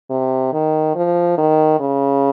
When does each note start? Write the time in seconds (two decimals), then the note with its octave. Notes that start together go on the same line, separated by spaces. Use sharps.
0.10 C3
0.53 D#3
0.96 F3
1.38 D#3
1.80 C#3